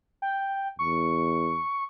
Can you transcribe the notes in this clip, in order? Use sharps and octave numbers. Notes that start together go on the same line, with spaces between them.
G5
E2 C#6